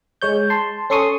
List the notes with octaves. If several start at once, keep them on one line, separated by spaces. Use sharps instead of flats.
G#3 C#5 G6
A5 C6
C#4 A4 C6 C#6 D#6 C7